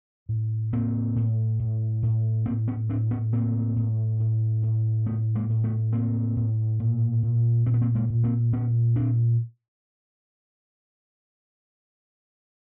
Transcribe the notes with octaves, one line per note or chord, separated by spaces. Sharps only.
A2
A2 A#3 C4
A2
A2
A2
A2 A#3 C4
B3 C#4
A2 C4 D4
B3 C#4
A2 A#3 C4
A2
A2
A2
A2 A3 B3
G#3 A#3
A2
A3 B3
A2 A#3 C4
A2
A#2
A#2
A#2 C4
B3
A#3 C4
G#3 A#3
A#2
A#3 C4
A#2 B3 C#4
A#2 C4 D4